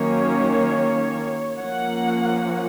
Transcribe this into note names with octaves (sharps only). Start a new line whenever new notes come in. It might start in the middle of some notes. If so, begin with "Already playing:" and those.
Already playing: D#3 F#3 A#3 C#4 C#5
F3 A#3 C#4 F#5